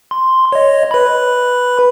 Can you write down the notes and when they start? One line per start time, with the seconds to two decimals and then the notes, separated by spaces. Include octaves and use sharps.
0.11 C6
0.52 C#5 D#5
0.91 B4 B5